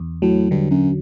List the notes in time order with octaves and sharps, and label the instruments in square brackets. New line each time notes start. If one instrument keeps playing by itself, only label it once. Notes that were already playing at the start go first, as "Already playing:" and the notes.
Already playing: [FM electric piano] E2
[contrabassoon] A2 [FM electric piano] F#3
[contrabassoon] G2 [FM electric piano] D3
[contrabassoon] F#2